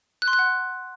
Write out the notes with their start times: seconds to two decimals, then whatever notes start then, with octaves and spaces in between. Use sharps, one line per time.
0.22 F#6
0.28 C6
0.33 F#6
0.39 F#5